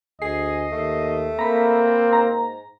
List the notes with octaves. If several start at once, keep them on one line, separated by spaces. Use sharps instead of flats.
D2 G#4 D#5 C7
D#2 A3
A#3 C4 A#5 B5
G#2 A#5